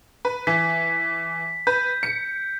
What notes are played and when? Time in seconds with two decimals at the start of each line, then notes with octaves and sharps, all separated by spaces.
0.25 B4
0.47 E3 B6
1.67 B4 G6
2.03 C#7